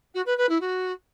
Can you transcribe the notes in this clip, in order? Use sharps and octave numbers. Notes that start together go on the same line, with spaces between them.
F#4
B4
B4
E4
F#4